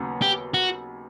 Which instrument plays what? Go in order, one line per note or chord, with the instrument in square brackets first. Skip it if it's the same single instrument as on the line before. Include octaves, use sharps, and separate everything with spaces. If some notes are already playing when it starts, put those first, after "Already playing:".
Already playing: [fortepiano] D#2 C#3 F#3 B3
[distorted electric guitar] G4
F#4